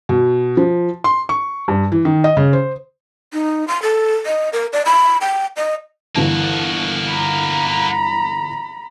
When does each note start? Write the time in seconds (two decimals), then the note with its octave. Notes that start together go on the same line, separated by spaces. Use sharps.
0.09 B2
0.57 F3
1.04 C6
1.29 C#6
1.68 G2
1.92 E3
2.05 D#3
2.24 D#5
2.37 C#3
2.53 C5
3.33 D#4
3.68 C6
3.82 A4
4.26 D#5
4.53 A#4
4.73 D5
4.86 B5
5.21 G5
5.57 D#5
6.15 G1 E3 A#3 F#4 A5
7.08 A#5 B5